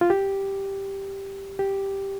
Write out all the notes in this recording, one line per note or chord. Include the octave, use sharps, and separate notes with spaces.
F4
G4
G4